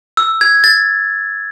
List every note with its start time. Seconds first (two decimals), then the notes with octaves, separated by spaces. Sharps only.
0.17 E6
0.41 G#6
0.64 A6